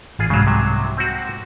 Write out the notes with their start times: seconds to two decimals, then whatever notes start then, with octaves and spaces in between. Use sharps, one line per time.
0.19 A1 F4 G#4
0.30 C2 G#2 C#3 F#3
0.47 C3 F#3
0.97 C4 F#4